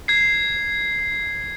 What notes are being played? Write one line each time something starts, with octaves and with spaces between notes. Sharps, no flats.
G#6 C7